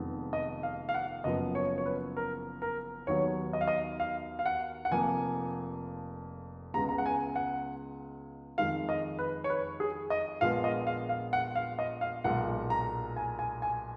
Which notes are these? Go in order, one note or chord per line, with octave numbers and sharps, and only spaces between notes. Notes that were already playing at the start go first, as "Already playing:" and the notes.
Already playing: F1 F2 D#3 G#3 B3
D#5
F5
F5
F#5
F#1 F#2 F3 B3 D#5
C#5
C#5
B4
A#4
A#4
D#2 D#3 F#3 B3 C#5
D#5
F5
D#5
F5
F5
F#5
F#5
F1 F2 F3 A#3 G#5
C#2 C#3 G#3 B3 A#5
A#5
F#5
G#5
F#5
F2 D#3 G#3 F5
D#5
B4
C#5
B4
G#4
D#5
A#1 A#2 F3 G#3 B3 F5
D#5
F5
F5
F#5
F5
D#5
F5
B1 A#2 G#3 F#5
A#5
G#5
G#5
G#5